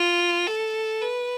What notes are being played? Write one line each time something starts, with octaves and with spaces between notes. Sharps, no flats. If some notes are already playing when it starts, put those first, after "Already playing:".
Already playing: F4
A4
B4